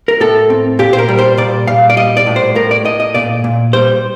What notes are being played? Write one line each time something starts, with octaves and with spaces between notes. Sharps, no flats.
A#4
A2 A4
C4
A#2 G4
C5
A#4
G3
C5
A#2 D5
A#2 F5
D5
G3 D#5
D5
A2
C5
A2 A#4
D5
A2 D#5
D#5
A#2 D5
A#2
G3 C5